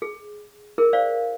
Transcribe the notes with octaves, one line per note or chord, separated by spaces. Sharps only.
G#4
E4 G#4 A#4
C5 D5 F5